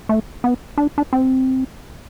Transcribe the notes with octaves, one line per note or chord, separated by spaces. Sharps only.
A3
B3
D4
D4
C4